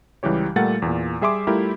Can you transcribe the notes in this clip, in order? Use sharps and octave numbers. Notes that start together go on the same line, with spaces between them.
C#2 E3 G3 G4 C#5
A#2 G3 A3 A#4 F#5 A6
E2 A#2
G3 G#4 E5 C6 D6
G3 A3 E4 F4 G4 A#4